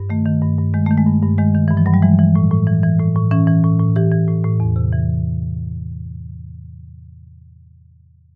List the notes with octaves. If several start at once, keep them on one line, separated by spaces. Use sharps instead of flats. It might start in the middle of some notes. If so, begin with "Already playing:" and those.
Already playing: G2
D#3 A3
D#3
G2
G2
D#3 G#3
D#3 A3
G#3
G2
G2
D#3 G#3
D#3
G2 E3
F3
G2 F#3
G3
E3 G#3
E3
A2
A2
E3
E3
A2
A2
E3 C#4
E3
A2
A2
E3 G4
E3
A2
A2
E2
C3
E3